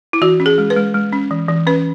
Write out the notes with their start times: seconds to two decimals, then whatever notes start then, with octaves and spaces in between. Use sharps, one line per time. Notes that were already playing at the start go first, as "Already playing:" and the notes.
0.13 E4
0.22 E3 F#4
0.40 C#4
0.46 G#4
0.58 G#3
0.70 B4
0.76 G#3
0.94 G#3
1.13 C#4
1.31 E3
1.48 E3
1.67 C#4 B4